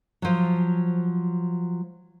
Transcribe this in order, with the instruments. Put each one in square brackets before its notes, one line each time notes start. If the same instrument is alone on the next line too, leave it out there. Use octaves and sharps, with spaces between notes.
[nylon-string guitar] F3 F#3